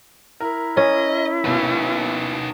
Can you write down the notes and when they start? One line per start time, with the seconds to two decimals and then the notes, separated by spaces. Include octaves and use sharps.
0.40 E4 A#4
0.77 C#4 D#5
1.45 D#2 B2 D#4 B4